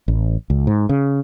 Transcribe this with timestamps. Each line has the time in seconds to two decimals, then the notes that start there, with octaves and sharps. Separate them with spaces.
0.08 A1
0.50 C#2
0.67 G#2
0.89 C#3